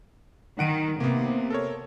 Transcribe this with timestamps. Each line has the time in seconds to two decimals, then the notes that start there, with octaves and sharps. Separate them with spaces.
0.59 D#3 F#5 D7 D#7
1.00 C3 A#3 B3
1.50 A4 A#4 C#5